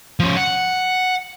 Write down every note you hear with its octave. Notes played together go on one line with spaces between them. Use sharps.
F3 C#4
F#5